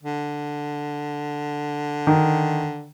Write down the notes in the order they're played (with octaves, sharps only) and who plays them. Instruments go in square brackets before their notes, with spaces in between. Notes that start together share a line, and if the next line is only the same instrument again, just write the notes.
[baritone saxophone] D3
[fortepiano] D#3